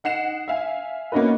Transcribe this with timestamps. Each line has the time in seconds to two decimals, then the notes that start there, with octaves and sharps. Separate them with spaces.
0.04 D#4 F#5 C7 E7
0.48 E5 F5 G#5
1.12 A#3 B3 C#4 D#4 F#4 B4